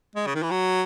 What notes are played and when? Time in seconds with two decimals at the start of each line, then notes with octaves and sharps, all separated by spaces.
0.15 G#3
0.26 C#3
0.35 D#3
0.43 E3
0.51 F#3